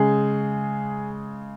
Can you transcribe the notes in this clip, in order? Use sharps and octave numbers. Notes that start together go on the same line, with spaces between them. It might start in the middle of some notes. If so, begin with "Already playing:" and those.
Already playing: C#3 G#3 G#4